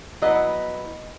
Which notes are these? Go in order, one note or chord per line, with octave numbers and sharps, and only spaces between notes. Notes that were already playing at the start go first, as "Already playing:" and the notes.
F#3 B3 E4 D#5